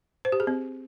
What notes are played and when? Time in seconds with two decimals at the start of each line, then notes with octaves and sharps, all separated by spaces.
0.25 C5
0.32 G4
0.40 G#4
0.47 C4